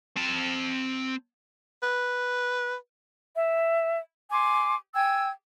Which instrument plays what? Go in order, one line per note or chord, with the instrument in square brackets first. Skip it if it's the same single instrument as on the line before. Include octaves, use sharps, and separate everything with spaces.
[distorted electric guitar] C4 A5
[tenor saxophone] B4
[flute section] E5
G#5 C6 D6
G5 G#5 E6 G#6